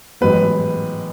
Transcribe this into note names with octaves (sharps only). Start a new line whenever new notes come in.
A1 G#2 F#3 B3 B4